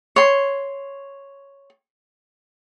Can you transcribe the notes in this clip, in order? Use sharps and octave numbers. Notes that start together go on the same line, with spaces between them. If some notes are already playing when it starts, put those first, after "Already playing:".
C#5 C6